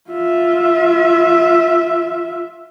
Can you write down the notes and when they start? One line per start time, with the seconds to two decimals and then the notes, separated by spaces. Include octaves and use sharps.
0.10 F4 E5